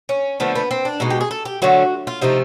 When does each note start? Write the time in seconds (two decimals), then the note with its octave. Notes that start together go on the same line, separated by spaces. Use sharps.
0.09 C#4
0.40 D3 F3 A3 B3
0.55 B3
0.71 C4
0.85 D4
1.00 B2 G#3 D#4
1.10 G4
1.21 G#4
1.31 A4
1.45 G4
1.62 D3 F#3 A3 F#4
2.07 F4
2.21 C3 F3 A3 D#4